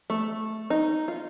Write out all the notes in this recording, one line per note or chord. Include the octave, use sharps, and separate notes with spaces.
A3
D#4
F4